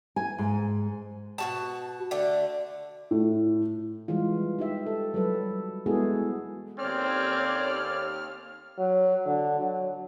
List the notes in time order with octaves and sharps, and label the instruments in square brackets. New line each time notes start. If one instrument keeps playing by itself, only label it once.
[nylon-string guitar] G#5
G#2
[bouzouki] B2 F#4 A5
D3 A3
[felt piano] A2
[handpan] E3 G3 G#3 F4
D#4 G4 E5
A4
F#3 G3 A4 B4
G#3 B3 E4 F#4 G#4 A4
[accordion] D#2 F6 [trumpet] C4 [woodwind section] C#4 A4 D5 [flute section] C#5
[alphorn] F#3
D3
F#3